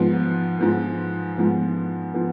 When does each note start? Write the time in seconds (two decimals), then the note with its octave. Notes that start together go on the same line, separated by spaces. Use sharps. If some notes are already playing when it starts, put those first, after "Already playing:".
Already playing: G#2 F3 B3
0.59 G#2 F3 B3
1.37 G#2 F3 B3
2.14 F3 B3